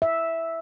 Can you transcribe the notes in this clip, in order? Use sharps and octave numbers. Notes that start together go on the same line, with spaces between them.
E5